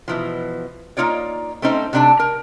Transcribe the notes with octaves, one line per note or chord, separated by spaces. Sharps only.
B2 E3 F3
A#3 D#4 F4 C#5 D5
A3 C4 C#4 D#4 C5
C3 A3 D4 D5 A5
A#4